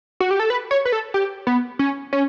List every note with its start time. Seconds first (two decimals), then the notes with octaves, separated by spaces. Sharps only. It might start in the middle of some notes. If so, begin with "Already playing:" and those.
0.20 F#4
0.31 G4
0.39 A4
0.50 B4
0.71 C#5
0.85 B4
0.92 A4
1.14 G4
1.47 B3
1.79 C#4
2.13 C#4